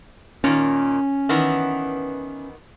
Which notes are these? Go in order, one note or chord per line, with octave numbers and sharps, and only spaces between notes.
A#2 D#3 C#4
D#3 E3 B3